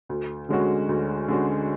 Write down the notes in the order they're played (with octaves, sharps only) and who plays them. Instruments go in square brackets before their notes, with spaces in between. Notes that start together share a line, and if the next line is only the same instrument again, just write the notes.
[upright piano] D2
D3 G#3 C#4 F#4
D2
D3 G#3 C#4 F#4